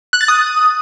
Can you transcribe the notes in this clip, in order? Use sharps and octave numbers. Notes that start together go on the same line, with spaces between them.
F#6
A6
D#6